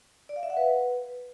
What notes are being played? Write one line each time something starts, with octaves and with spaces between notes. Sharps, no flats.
D5
F5
E5
F#5
B4